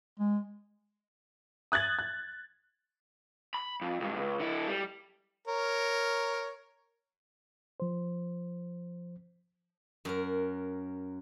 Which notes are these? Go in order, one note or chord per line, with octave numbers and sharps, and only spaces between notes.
G#3
D#6 F#6 G#6 A6 F#7
F#6
B5
F2
C#2 G2
C#2
D3 E4
G3
A#4 C#5
F3 C5
F#2 A#4